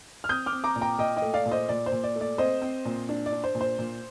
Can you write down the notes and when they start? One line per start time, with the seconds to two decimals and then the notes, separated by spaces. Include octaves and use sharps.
0.24 F6
0.29 C4 D#6 G6
0.46 D6 F6
0.52 C4
0.64 A#5 D6
0.76 A#2
0.81 G5 A#5
0.99 A#2 D#5 G5
1.16 D#5 G5
1.22 A3
1.34 D5 F5
1.46 A#2
1.51 C5 D#5
1.69 A#2 D5
1.86 C5
1.92 A#2
2.03 D5
2.16 A3
2.21 D5
2.38 C4 C5 D#5
2.62 C4
2.85 A#2
3.09 D4
3.26 D5
3.32 D4
3.44 C5
3.55 A#2
3.61 C5
3.78 A#2